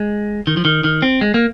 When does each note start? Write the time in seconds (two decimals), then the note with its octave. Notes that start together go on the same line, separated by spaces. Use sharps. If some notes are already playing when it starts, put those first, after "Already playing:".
Already playing: G#3
0.47 D#3
0.57 F3
0.65 D#3
0.84 D#3
1.02 C4
1.21 G#3
1.34 A#3